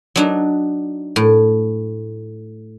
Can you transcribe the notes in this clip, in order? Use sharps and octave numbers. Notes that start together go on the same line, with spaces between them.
F#3 D4 D#4
A2